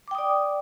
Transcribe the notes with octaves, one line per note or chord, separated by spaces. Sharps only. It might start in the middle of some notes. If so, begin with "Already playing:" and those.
D5 G5 D6 D#6